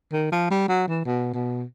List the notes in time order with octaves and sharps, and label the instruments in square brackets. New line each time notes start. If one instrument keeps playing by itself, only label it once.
[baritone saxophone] D#3
F3
G3
F#3
E3
B2
B2